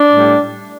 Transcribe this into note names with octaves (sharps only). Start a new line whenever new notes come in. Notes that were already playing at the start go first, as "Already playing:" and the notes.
Already playing: D4
A2 G3